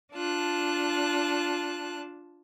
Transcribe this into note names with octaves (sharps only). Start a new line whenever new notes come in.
D4 F4 A5 F#6